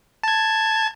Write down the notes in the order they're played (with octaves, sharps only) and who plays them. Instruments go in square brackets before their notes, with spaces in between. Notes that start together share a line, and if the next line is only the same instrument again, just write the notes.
[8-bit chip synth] A5 G#6